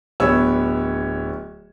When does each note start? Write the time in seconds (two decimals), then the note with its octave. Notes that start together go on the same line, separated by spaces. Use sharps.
0.20 D1 B3 C#5 E6